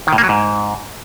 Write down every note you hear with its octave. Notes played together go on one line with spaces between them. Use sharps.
D#3
A2
A#3
F#3
G#2